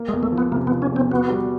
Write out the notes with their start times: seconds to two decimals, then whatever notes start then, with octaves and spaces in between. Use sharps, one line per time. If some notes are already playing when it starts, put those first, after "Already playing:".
Already playing: A#3
0.08 G#3
0.14 E2
0.23 A3
0.32 F3
0.38 B3
0.52 C3 A#3
0.67 B3
0.71 F3
0.82 C#4
0.92 E2 C4
1.11 B3 F#4
1.30 G3